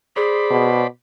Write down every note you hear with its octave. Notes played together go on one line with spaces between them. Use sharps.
G#4 C5 D5 B5
B2